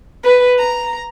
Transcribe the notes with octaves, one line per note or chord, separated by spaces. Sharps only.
B4
A#5